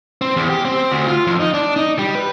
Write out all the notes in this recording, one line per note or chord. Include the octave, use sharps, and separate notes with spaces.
C4
E2
G4
C4
D2
F4
F2
D#4
D4
D#4
G3
B4